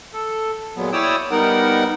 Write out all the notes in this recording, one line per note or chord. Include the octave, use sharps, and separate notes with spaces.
A4
A#2 F#3 G#3 B3
E4 C#5 D5 G5 D#6 E6
G3 B3 D#4 A#4 F#5